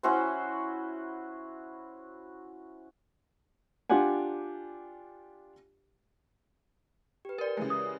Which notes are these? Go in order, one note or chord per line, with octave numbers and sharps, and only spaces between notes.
C#4 E4 F#4 C5
D4 F4 G4 D5 F#5 G#5
G4 B4
A#4 D5
C#3 E3 G#3
D#6